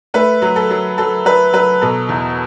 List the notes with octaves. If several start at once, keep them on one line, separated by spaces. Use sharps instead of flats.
A3 B4
F#3
A4
F#3
F#3 A4
F#3 B4
F#3 B4
B2 A4
E2